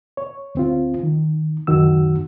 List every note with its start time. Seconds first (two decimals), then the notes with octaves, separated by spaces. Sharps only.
0.17 C#5
0.55 D2 C4 F4
1.03 D#3
1.67 C#2 F#2 D#3 F#4 E6